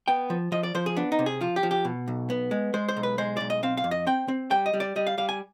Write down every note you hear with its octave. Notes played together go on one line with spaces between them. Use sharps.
B3 G5
F3
F3 D#5
D5
F3 C5
G#4
B3 D4
D#4
C3
G#4
F3 F4
G4
F3
G4
B2
B1
B3
G#3
G#3 C5
C5
B1
B4
G#3 C5
B1 D5
D#5
C4 F5
F5
F2
D#5
C4 G5
C4
G3 G5
D#5
G3
D5
G3 D#5
F5
G3 F5
G#5